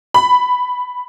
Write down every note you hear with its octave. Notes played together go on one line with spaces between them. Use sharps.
B5